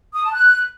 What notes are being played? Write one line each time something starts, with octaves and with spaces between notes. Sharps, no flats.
D#6
A5
F#6